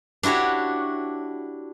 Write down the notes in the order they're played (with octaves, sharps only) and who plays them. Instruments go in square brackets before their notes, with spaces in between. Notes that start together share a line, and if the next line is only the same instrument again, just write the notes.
[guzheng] D4 E4 F#4 G4 C#5